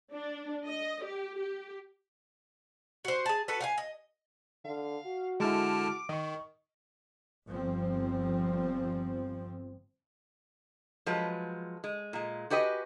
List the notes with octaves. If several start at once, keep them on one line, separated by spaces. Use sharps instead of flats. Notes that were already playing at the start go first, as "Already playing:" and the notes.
D4
D#5
G4
G4
F#4 C5
G#4 A5
F#4 A4 B4
F5 F#5 G#5
D#5
D3 F5
F#4
D3 G#3 E4 A5 D6 F6
D#3 D#5 C#6
G1 F3 C4
F3 F#3 G#3 B4
G#3
A#2 G#3
F#4 G4 B4 D#5 G#5